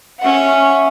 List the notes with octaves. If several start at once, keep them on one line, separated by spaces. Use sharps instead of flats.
C#4 E5 F#5